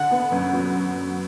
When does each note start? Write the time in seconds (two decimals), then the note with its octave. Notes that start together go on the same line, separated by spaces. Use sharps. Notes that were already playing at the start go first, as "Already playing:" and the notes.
Already playing: D3 F#5
0.11 B3
0.32 F#2
0.53 F#3